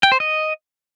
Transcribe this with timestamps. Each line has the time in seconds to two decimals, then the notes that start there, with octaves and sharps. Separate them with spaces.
0.03 G5
0.12 C5
0.20 D#5